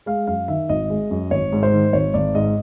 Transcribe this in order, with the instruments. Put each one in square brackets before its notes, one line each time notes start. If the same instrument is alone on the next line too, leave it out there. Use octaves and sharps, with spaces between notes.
[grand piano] G#3 F5
F#2 F5
D#3 E5
G#1 D#5
G#3
F#2
G#1 C#5
G#2
C5
D#3
G#1 C#5
G#1 D5
G#2 D#5